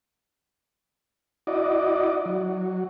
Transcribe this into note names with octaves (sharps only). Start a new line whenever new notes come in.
E4 F#4 D5 D#5
F#3